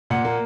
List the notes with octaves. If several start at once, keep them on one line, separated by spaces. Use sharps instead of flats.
A#2 F#5
A#3